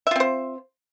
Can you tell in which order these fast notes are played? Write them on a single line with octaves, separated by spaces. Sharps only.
E5 F4 C4 C5